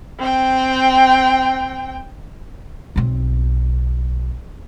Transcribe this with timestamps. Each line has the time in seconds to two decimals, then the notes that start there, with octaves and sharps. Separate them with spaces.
0.19 C4 G5
2.96 B1 C4